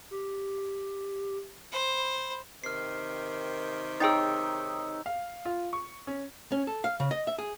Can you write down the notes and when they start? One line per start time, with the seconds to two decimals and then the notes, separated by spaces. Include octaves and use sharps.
0.11 G4
1.72 C5 B5
2.64 C3 D#3 F6 C7
4.00 D#4 G#4 C#5 G5 A#5 E6 A6
5.06 F5
5.45 F4
5.73 C#6
6.07 C#4
6.52 C#4
6.67 A4
6.84 F5
7.00 C#3
7.11 D#5
7.27 E5
7.39 G#4